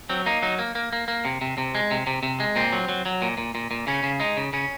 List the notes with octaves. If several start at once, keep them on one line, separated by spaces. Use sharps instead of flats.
F#3 C4
A#3 D#4
F#3 D#4
A#3
A#3
A#3
A#3
C3
C3
C3
G#3
C3
C3
C3
G#3
A#2 C4
F#3
F#3
F#3
A#2
A#2
A#2
A#2
C#3 C#4
C#3
G#3 D#4
C#3
C#3 C#4